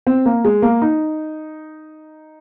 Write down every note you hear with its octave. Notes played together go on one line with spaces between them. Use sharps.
C4
A#3
G#3
A#3
D#4